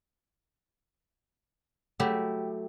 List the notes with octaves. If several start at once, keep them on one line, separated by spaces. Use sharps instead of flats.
F#3 A3 E4 G4